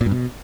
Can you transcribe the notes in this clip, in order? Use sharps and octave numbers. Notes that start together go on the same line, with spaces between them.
A#2
G2
B2